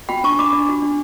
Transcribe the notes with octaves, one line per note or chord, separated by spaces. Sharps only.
F#4 G5 B5
D4 A5 C#6
D4 B5 D6
D4
F#4
D4